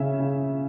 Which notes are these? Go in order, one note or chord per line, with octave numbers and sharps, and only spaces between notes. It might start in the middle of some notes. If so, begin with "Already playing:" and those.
Already playing: C#3 C#4 E5
C#3